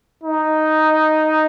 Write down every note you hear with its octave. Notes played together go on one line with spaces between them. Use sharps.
D#4